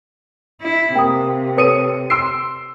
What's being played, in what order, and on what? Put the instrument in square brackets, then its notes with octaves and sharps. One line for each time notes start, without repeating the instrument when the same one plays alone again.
[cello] E4
[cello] C3 [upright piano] A#3 [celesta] G5 D#6
[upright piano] A4 C#7 D#7 [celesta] B4 C#5 D#6
[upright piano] C6 E6 C7 [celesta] D7